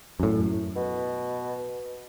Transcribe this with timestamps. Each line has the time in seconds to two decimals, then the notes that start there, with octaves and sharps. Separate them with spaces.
0.20 F#2 A2
0.76 B2